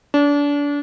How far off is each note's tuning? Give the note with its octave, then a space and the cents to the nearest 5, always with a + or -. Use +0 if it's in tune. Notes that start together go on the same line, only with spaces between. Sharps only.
D4 -30